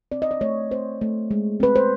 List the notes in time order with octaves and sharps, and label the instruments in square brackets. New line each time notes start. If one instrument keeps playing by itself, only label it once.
[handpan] C4 D5
D#5
D5
A3 C#5
C4 C5
A3
G#3
C4 B4
C5